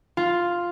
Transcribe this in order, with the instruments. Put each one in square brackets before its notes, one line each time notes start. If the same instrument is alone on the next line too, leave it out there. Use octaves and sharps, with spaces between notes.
[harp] F4